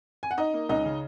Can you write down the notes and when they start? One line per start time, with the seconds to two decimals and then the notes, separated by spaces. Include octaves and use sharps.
0.23 G#5
0.31 F#5
0.38 D#4 D#5
0.54 A#3
0.69 C#2 D#4 D#5
0.85 C#3